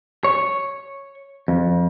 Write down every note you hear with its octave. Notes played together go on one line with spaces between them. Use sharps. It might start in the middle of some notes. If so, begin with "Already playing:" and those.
C#5
F2